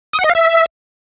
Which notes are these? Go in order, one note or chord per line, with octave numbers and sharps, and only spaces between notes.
D#6
F#5
D#5
F5
E5